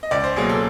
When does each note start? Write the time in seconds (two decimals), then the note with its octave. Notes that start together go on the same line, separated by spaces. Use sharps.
0.03 D#5
0.11 C#2 D5
0.24 C5
0.36 B2 F#3 A#3 G#4
0.50 A4